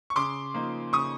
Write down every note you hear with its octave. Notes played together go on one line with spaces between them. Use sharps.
C#6
C#3 C6 D6
F3 A#3 D#4
C#3 C#6 D#6